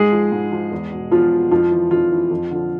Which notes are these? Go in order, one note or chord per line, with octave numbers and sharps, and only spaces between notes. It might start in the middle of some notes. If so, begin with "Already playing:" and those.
Already playing: G#2 G#3 G#4
F3
G#2
F3
E2
B2
E2 F3 F4
B2
F2 F3 F4
E3
F2 F3 F4
E3
F2
D3 F3